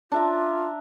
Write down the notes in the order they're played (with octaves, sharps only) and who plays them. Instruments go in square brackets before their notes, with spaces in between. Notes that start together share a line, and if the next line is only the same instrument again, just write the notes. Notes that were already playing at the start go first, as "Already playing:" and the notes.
[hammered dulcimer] D4 E5 A#5 [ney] F4